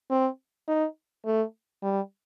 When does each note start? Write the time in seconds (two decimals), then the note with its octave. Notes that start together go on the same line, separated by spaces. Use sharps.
0.10 C4
0.68 D#4
1.25 A3
1.83 G3